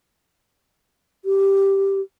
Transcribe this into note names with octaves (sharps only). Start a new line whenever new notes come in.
G4